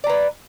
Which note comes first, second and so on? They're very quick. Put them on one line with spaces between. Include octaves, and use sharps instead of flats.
D5 A#5 B4